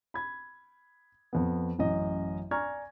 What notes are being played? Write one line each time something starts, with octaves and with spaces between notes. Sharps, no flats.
B5 G#6
F2 B3
A1 F#2 D#5
D5 G#5 A#5 C#6 F6 G#6